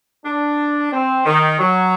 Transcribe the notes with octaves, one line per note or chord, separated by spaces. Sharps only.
D4
C4
D#3
F#3